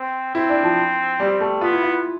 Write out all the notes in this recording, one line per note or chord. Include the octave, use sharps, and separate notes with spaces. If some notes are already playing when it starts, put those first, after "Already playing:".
Already playing: C4
C4 E4
D4
F3
G3
A3
B3 F4
E4
F4